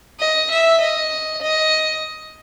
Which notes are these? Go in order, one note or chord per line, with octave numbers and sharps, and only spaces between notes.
D#5
E5
D#5
D#5